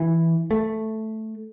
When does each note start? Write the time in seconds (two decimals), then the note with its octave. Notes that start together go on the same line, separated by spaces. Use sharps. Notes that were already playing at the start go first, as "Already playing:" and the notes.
Already playing: E3
0.51 A3